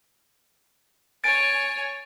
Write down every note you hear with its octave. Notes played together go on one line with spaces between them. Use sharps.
C#5 G#5 A6 D7